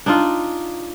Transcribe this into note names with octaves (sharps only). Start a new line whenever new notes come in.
D4 D#4 F4